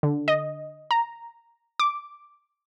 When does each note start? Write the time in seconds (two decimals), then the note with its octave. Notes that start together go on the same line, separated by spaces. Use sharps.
0.03 D3
0.28 D#5
0.91 A#5
1.80 D6